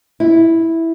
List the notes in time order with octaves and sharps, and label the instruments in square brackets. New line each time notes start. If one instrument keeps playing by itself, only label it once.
[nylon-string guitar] E4